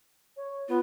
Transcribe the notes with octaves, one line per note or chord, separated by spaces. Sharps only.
C#5
B3 F4